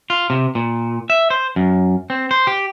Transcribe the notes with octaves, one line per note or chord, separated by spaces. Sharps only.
F4
C3
A#2
E5
C5
F#2
C4
C5
G4